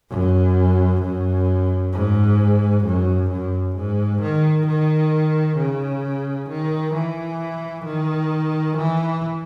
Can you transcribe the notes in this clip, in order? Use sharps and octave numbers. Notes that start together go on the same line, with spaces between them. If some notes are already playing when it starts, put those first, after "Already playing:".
F#2
F#2
G#2
F#2
F#2
G#2
D#3
D#3
C#3
D#3
E3
D#3
E3